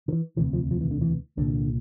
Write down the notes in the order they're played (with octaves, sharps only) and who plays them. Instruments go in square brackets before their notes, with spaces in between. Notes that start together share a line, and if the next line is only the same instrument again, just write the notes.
[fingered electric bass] D3
E3
E1 D2 C3 E3
F3
F3
E3
D3
E3
C2 A#2 D3